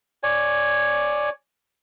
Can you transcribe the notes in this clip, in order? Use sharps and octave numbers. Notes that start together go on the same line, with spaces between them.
C#5 D5 G#5